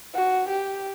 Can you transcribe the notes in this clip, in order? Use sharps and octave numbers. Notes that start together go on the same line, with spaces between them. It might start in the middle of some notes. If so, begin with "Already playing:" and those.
F#4
G4